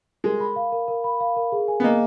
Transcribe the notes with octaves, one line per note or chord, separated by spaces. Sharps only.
G#3 A#4
B5
F5
A#4
A#4
B5
F5
A#4
G#4
G#5
B3
A#3 D#5